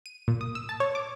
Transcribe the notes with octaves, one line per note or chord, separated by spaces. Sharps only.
D#7
A#2
D#6
E6
A5
C#5
D6